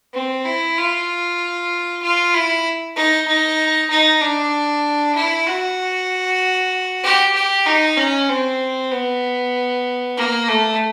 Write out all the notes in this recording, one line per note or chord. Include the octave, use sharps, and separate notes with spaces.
C4
E4
F4
F4
E4
D#4
D#4
D#4
D4
E4
F#4
G4
G4
D#4
C#4
C4
B3
A#3
A3